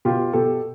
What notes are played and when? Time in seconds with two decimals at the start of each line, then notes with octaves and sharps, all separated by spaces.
0.05 B2 F4 G4
0.33 B2 G4 A4